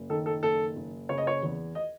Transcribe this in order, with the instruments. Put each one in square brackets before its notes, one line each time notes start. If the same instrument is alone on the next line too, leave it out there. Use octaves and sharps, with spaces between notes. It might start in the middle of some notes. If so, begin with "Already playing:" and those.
Already playing: [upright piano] F#1
D#3 A4
A4
F#1 A4
F#1
C#3 C#5
D#5
C#5
E2
D#5